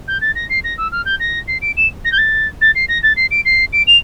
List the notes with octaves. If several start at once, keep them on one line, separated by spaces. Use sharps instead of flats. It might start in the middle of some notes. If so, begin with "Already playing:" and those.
G6
A6
A#6
C7
A#6
E6
F6
G6
A#6
C7
D7
E7
A#6
G6
A6
A6
C7
A#6
A6
C7
D7
C7
D7
F7